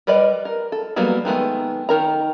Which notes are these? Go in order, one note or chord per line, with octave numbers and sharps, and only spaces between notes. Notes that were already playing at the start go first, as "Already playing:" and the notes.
G3 A#4 B4 D5 D#5
A#4
A4
F#3 G3 A#3 B3 F#4
D#3 G#3 A3 B3
D#3 A#4 A#5